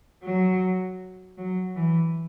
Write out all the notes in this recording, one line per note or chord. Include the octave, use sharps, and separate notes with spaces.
F#3
F#3
E3